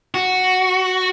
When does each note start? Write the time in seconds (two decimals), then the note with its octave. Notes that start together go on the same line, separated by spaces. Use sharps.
0.14 F#4